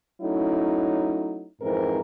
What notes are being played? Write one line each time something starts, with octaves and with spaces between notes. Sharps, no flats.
F#3 A3 C#4 D#4 E4
F2 G#2 E3 C4 A#4